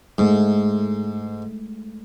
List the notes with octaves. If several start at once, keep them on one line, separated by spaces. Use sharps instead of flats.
G#2 G#3 A3